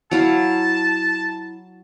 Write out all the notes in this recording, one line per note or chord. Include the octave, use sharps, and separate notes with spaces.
F#3 E4 F5 A5